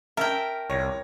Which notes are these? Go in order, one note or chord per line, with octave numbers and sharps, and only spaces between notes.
C#4 A#4 E5 G5 A5
C2 C#5 A#6